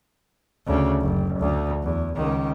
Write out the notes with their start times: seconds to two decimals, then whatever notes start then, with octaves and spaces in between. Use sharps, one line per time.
0.66 D2 C#3
1.00 F#1
1.39 D2
1.82 E2
2.14 C#2 D#3